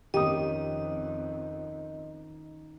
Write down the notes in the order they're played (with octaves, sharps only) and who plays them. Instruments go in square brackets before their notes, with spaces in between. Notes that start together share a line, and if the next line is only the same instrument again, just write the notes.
[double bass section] F2 [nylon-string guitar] D#3 C#4 [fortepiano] G4 D#6 [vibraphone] D#5